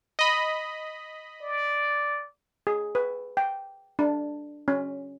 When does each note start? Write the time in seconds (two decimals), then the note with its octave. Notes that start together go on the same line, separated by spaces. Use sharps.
0.19 D#5 B5
1.42 D5
2.67 G#4
2.95 B4
3.37 G5
3.99 D4
4.68 C#4